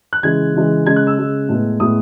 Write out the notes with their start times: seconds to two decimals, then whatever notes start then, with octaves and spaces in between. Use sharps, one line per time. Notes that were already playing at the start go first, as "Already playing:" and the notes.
0.13 F#6
0.23 C#3 E3 G#3 G#6
0.54 C#3 E3 G#3
0.86 C#3 G#3 C#4 G#6
0.96 F#6
1.07 E6
1.18 C#3 G#3 C#4
1.49 A2 G#3 B3
1.80 A2 G#3 B3 D#6